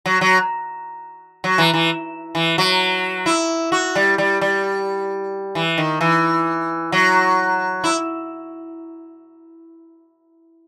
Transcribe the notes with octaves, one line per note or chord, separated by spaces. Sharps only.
F#3
F#3
F#3
E3
E3
E3
F#3
E4
F#4
G3
G3
G3
E3
D#3
E3
F#3
E4